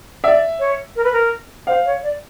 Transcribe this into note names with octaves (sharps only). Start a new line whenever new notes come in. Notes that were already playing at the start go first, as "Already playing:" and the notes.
D5 E5
C#5
A#4
B4
A#4
C5 F5
C#5
D5